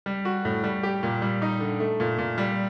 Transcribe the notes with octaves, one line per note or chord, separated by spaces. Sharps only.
G3
F#4
A2
G3
G4
A#2
G3
D#4
D3
A3
A#2
A#2
G3